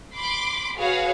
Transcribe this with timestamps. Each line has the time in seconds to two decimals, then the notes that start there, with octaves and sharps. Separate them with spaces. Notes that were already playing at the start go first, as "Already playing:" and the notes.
0.15 B5 C6 D6
0.78 F#4 G#4 B4 C#5 F5